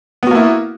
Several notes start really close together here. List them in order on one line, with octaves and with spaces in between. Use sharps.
B3 F#4 A#3 E4